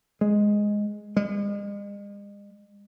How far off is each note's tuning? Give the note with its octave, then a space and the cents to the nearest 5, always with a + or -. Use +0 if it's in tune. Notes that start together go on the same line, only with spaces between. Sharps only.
G#3 +0
G#3 -45